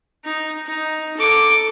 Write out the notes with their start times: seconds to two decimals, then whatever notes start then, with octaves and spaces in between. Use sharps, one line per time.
0.25 D#4
0.66 D#4
1.17 A4 D6